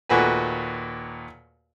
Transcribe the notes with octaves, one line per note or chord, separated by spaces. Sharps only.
D#2 A#2 A3 F#4 B4 G#5